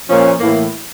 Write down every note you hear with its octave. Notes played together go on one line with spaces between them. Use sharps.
A#2 F3 C#4
A2 E3 A#3